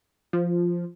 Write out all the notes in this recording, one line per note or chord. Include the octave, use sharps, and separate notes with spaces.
F3